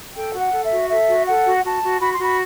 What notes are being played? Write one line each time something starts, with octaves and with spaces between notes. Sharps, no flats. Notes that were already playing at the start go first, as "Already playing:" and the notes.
A4 G5
F#4
F#5
A4
E5
F#4
A4 E5
F#4
A4 F#5
F#4
F#4 A5
F#4
F#4 B5
C6
F#4 B5